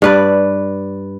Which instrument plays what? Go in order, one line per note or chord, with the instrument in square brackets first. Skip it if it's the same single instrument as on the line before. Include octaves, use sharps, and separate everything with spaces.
[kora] G2 B4 D5